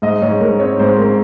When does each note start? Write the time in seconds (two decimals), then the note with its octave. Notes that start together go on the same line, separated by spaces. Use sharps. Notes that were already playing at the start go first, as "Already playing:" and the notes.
0.02 G#2 D#5
0.22 G#2 C#5
0.41 G#2 A#4
0.60 C4 C#5
0.79 G#2 C5
0.98 G#2 A#4